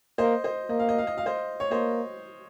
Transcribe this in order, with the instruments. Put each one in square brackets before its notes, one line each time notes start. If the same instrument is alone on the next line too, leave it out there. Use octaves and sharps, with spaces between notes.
[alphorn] A#3 [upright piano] C5 D#5
[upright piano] C5 D#5
[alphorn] A#3 [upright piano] D#5
[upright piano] F5
D#5
F5
D#5
F5
C5 D#5
C#5
[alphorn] A#3 [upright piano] C5 D#5